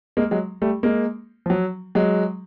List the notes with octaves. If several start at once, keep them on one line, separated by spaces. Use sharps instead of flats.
G#3 A#3
F#3 G#3
G3 A3
G#3 A#3
F3
F#3
F#3 G#3